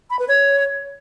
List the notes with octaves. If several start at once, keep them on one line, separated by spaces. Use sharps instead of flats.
B5
B4
C#5